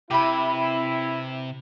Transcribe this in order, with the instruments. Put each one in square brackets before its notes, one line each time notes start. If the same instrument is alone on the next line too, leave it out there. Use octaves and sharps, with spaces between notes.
[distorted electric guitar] C3 [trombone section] E4 [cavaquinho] G4 B4 B5